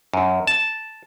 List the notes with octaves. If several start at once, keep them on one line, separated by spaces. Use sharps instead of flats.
F#2
A5